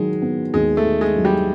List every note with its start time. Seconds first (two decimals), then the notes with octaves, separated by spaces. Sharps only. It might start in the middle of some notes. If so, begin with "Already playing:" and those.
Already playing: D#3 F#3 G#3
0.22 B3
0.54 D#2 G#3
0.77 A3
0.85 D#3
1.01 G#3
1.17 F#3
1.25 G3